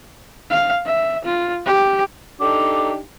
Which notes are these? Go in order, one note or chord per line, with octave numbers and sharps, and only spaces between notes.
F5
E5
F4
G4
D4 D#4 G4 A4 A#5 D6